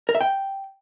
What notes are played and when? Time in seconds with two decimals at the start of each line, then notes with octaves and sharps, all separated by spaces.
0.09 A#4
0.15 E5
0.21 G5